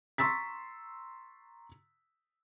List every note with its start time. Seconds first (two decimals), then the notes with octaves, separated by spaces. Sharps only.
0.18 A#5 C6 C#6 E6 A6 B6